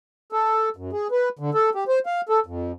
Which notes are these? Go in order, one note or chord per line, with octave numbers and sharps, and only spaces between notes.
A4
F#2
G#4
B4
D3
A4
G4
C5
F5
A4
F2